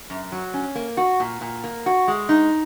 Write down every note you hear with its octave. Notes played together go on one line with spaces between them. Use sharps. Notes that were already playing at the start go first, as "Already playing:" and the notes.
F#2
F#3
C#4
A#3
F#4
A#2
A#2
A#3
F#4
G#3
D#4